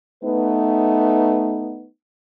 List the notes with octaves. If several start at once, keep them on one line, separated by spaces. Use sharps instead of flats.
A3 B3 D#4 B4